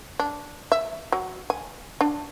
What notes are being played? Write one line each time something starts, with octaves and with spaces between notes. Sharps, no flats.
D4
E5
F#3
G#5
D4